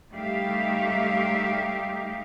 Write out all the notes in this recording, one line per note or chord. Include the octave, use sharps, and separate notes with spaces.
G3 A3 D#4 G4 E5 F5